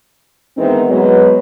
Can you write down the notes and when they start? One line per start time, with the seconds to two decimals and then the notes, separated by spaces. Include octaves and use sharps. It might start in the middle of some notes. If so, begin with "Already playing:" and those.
0.58 G#2 D#3 E3 B3 C4
0.89 B2 F#3 G#3 B4